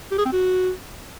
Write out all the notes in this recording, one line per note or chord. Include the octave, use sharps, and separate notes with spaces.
G4
G#4
C4
F#4